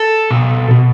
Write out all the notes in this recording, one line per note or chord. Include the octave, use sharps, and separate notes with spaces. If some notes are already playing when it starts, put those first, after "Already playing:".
Already playing: A4
B2
B2